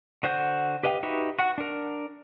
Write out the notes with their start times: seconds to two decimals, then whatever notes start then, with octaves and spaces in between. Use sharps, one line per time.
0.23 D3 F#4 C5 F#5 G6
0.83 G4 B4 D#5 F5 G5
1.03 D#4 F#4 G4 B4 E5
1.39 F#4 F#5
1.58 D4 A#4